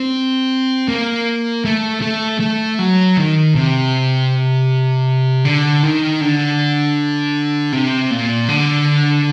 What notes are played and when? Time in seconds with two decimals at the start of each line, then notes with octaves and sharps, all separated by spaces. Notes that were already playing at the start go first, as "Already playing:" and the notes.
Already playing: C4
0.88 A#3
1.65 A3
2.02 A3
2.40 A3
2.79 F#3
3.17 D#3
3.55 C3
5.45 D3
5.83 D#3
6.21 D3
7.72 C3
8.11 A#2
8.49 D3